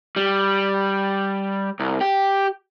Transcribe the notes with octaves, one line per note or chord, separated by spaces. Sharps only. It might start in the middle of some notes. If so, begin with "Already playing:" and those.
G3
C2
G4